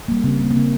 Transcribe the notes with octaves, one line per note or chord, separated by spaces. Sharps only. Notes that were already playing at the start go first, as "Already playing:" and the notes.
G3 A#3
C#3 C4
G3 A#3
A#3
C#3 C4